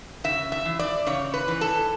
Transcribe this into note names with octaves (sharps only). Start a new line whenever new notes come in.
C#3 E5
E5
E3
D5
C#3 C#5
B4
E3
A4